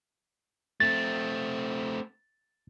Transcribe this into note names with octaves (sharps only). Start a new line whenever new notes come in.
A3 C4 A6